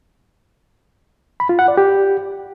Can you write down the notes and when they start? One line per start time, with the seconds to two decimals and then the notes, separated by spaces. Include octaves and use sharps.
1.40 B5
1.49 F4
1.59 F#5
1.68 D5
1.77 G4